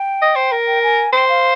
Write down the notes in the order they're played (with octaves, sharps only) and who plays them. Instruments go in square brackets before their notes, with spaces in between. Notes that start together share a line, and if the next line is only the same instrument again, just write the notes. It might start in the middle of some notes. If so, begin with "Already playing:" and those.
Already playing: [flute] G5
[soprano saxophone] D#5
C5
A#4
[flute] G5
G#5
[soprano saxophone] C5 [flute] G5
[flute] F5